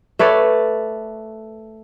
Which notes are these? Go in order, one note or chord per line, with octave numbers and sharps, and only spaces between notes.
A3 B4 C#5 D5